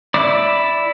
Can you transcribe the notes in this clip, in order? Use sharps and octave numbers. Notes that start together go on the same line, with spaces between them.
E4 D5 D6